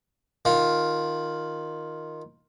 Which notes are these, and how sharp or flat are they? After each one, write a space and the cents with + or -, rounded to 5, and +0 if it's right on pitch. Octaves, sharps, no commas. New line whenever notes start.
D#3 +0 F4 +5